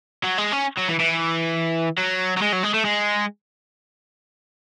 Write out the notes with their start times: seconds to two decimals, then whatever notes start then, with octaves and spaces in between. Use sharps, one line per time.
0.24 F#3
0.38 G#3
0.53 C#4
0.78 F#3
0.89 E3
1.00 E3
1.98 F#3
2.37 F#3
2.42 G#3
2.52 F#3
2.63 G#3
2.74 A3
2.85 G#3